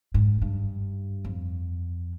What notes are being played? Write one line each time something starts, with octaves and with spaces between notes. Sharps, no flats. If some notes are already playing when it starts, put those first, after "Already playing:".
G#2
G2
F2